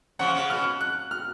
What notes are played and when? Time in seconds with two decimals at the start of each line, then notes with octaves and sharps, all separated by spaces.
0.19 C#3 F3 F#5
0.35 C#3
0.50 B2 F6
0.81 F#6
1.11 F6